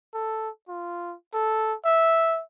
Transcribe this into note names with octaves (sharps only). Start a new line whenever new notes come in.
A4
F4
A4
E5